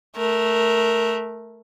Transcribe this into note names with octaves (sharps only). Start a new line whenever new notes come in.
A3 A#4